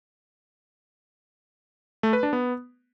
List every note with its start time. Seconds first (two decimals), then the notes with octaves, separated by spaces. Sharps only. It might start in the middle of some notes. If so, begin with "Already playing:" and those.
2.03 A3
2.13 B4
2.23 D4
2.33 B3